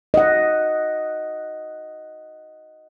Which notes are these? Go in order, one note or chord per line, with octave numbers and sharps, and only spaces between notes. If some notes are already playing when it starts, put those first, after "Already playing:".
D#5 F#5